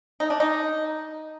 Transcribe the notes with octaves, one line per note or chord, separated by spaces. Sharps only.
D#4
D4
D#4